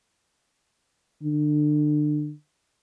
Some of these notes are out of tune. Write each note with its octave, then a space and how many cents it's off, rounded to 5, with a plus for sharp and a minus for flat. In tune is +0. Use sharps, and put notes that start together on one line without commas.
D3 +30